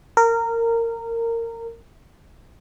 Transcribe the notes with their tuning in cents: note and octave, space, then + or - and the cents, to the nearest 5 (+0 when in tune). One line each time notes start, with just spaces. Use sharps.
A#4 -20